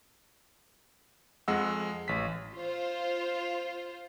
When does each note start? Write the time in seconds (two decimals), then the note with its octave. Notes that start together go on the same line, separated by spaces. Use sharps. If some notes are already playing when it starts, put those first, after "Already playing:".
1.48 F2 G#3 D#5 F#5 E6
2.08 A1 B6
2.53 F4 C5